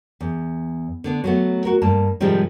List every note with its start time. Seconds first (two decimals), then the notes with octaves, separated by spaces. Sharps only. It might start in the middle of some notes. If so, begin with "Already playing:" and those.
0.21 E2
1.04 D3 B3 D4
1.24 F#3 A3 B3
1.65 F#4 A#4
1.82 G2 A#3 A5
2.20 G#2 C3 D#3 F3 G3 G#3